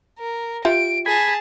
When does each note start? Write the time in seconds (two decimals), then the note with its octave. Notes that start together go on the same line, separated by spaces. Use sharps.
0.19 A#4
0.65 F4 G4 E5 D7
1.06 G#4 G#5 A5 B5